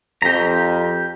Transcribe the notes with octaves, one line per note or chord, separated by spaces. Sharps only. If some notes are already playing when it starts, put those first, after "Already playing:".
F2 G4 A#5